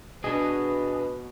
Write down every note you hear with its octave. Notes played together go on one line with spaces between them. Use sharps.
B2 D4 G#4 B4 D#5